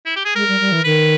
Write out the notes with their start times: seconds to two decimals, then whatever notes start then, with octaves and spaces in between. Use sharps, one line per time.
0.06 E4
0.16 G4
0.25 G#4
0.35 G#3 A#4
0.47 G3
0.60 G3
0.71 E3
0.84 D#3 B4